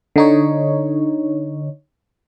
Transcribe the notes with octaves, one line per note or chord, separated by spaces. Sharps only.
D3 D#4 C#5